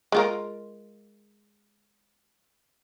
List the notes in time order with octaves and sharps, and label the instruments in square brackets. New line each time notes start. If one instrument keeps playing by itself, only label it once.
[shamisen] G#3 F4 A#4